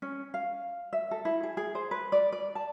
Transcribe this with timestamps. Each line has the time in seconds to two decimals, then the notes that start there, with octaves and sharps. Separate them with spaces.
0.02 C#4
0.34 F5
0.93 E5
1.11 A4
1.25 E4
1.43 G#4
1.57 G#4
1.75 C5
1.91 B4
2.12 D5
2.32 D5
2.55 A5